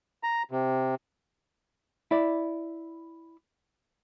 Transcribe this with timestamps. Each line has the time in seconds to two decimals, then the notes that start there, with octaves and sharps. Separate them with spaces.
0.23 A#5
0.51 C3
2.11 E4 D5